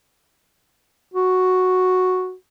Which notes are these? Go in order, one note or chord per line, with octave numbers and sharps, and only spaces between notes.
F#4